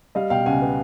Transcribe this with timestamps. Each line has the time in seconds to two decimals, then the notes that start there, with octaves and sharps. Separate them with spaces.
0.15 G3 D#5 F5
0.30 B2 F5 G5
0.46 C#2 F#5 G#5
0.62 B3